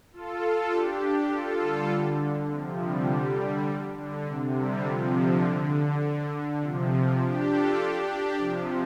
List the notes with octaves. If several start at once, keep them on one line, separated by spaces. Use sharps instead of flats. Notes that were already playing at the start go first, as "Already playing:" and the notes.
F4 A4
F4 A4
D4 G4
D4 G4
F4 A4
D3 G3
D3
C3 F3
D3 G3
D3
C3
D3 G3
C3 F3
D3
D3
D3
C3 F3
D4 G4
F4 A4
D4 G4
D4 G4
C3 F3